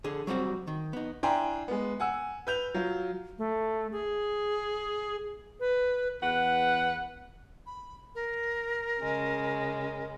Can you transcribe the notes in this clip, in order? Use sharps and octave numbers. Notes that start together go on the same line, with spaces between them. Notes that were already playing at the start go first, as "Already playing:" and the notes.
D3 G#4
F#3 G3 C4 F#4
D#3
B3 D#4
D4 E4 G5 G#5 A#5 C6
G#3 B3
F#5 G#5 E6
B4 G6 F7
F#3 F4
A3
G#4
B4
E2 B4 F#5
B5
A#4
C#3 G#3